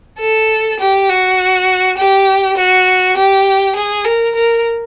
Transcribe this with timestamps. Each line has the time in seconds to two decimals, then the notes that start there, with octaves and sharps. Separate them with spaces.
0.20 A4
0.80 G4
1.09 F#4
1.98 G4
2.57 F#4
3.16 G4
3.76 G#4
4.05 A#4
4.35 A#4